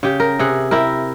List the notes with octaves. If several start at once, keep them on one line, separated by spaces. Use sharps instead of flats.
C#3 G4
A#4
C3 G#4 F#5
E4 G4 A#4